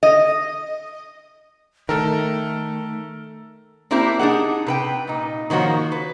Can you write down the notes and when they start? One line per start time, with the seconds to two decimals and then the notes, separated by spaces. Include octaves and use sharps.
0.03 D#5
1.89 D#3 A3 A4 A#4
3.91 A#3 C4 D4 E4 G4 A#4
4.19 D4 D#4 G#4 F#5
4.66 C3 B4 G5
5.07 A#2 D#4
5.50 D#3 F3 A#3 F#4 C#5
5.92 B4